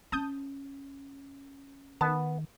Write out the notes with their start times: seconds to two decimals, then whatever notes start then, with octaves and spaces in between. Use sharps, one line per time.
0.12 C#4 A5 D#6 G6
2.01 D#3 B3 A5